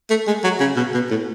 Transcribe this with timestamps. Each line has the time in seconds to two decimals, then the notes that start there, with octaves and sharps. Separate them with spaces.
0.10 A3
0.27 G#3
0.44 F#3
0.60 C#3
0.76 B2
0.94 B2
1.10 A2